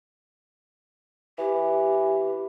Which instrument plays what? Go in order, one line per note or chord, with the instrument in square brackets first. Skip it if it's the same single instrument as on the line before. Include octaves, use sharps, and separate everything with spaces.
[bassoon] E3 [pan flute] G4